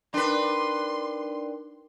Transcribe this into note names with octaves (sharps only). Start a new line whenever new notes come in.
D4 D#4 A#4 B4 G5 C6